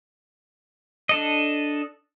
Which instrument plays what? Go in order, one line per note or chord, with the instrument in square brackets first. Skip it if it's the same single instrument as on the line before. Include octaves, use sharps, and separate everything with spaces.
[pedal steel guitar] D4 A4 D#5